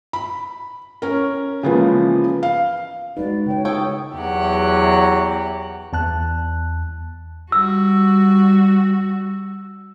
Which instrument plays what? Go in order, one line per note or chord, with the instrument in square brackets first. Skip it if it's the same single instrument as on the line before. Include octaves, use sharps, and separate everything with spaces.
[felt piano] B5
C#4 A#4
C#3 E3 F3 G#3 A#3 B3
F5
[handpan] G#3 F#4 B4 [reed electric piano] D#4 [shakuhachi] D5
[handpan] C#3 C#5 [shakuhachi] G5
[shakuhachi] G#4 [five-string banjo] A4 C#5 G5 [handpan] D#5
[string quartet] E2 F#3 G4 F#5
[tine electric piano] E2 A5 F#6
[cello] G3 F#4 [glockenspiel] E6